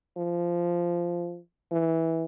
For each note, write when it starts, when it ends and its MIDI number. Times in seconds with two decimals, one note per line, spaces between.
0.17 1.39 53
1.71 2.25 52